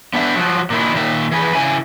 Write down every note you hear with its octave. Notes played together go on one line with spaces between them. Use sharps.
B3 D4 E5
F3 F#3
A#2 D#3 E4
A#2 D#3 E5
E3 G#4 B4
C#3 E4 G#5